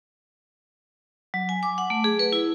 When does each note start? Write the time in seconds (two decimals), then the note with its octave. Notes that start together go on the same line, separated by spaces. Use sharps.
1.34 F#3
1.49 G#5
1.63 D6
1.78 F#5
1.90 A3
2.04 G#4
2.19 B4
2.33 E4